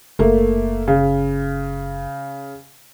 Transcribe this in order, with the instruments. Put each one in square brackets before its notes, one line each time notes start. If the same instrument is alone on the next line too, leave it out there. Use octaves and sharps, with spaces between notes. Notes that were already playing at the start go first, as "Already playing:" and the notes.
[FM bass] F#1 [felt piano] A3 A#3
[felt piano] C#3